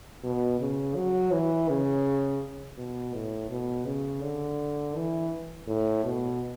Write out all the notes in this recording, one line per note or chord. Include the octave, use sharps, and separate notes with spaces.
B2
C#3
F#3
E3
C#3
B2
A2
B2
C#3
D3
E3
A2
B2